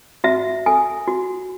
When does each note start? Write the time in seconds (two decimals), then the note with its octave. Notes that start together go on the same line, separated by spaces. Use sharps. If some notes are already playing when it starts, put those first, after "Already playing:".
0.24 F#4 E5
0.66 A4 G#5
1.08 F#4